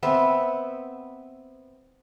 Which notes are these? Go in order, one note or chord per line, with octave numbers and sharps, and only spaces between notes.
B3 C4 E5